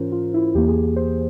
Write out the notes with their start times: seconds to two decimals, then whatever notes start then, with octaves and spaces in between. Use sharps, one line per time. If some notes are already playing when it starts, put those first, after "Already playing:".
Already playing: G#2 E3 C#4 F4 A#4 C5
0.12 F4
0.34 E4
0.55 E2 E3 A#3 G4
0.68 G#4
0.96 C5